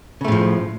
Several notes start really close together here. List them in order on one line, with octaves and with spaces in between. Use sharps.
C#3 A3 A2 F3